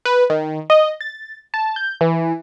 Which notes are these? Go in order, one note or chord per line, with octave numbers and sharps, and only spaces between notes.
B4
D#3
D#5
A6
A5
G6
E3